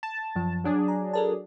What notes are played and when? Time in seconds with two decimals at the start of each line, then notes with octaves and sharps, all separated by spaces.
0.03 A5
0.36 F#2 F3
0.64 F#3 D4 G#4
0.88 A#5
1.13 A4 A#4 A5